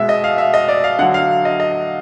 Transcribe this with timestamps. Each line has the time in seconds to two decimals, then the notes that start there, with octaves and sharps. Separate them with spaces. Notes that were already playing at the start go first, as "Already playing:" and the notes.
Already playing: B2 G#3 E5
0.09 D#5
0.24 F5
0.38 E5
0.54 D#5
0.68 D5
0.84 F5
0.99 D3 F#5
1.02 F#3
1.14 F5
1.45 D#5
1.60 D#5